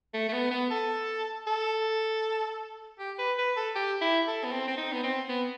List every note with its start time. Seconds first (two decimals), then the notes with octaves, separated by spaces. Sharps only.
0.14 A3
0.29 A3
0.33 B3
0.51 B3
0.70 A4
1.47 A4
2.99 G4
3.19 B4
3.38 B4
3.57 A4
3.75 G4
4.01 E4
4.27 A4
4.44 B3
4.52 C4
4.67 C4
4.77 D#4
4.92 B3
5.03 C4
5.29 B3